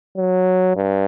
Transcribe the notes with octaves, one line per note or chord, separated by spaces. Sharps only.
F#3
G2